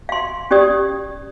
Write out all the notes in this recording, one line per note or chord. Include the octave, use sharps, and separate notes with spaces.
F5 C6
C#4 G4 D5 D#6